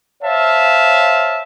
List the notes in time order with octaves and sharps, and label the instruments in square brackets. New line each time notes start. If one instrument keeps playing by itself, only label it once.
[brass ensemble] C5 C#5 E5 F5 A5